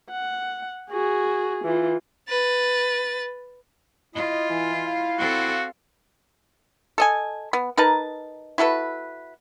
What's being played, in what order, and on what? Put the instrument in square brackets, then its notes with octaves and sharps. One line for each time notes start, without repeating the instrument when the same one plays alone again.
[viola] F#5
F#4 G#4
E3 F4
[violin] B4 A6
[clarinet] E4 [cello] F4 [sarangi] D#5
[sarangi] E3
F5
[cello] C4 A4 [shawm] F#4
[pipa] A4 D#5 G#5
B3
D#4 A#4 B4 A5
E4 F#4 A4 B4